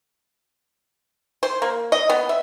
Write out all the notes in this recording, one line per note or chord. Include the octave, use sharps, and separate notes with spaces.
C5
A#3
D#5
B3
E5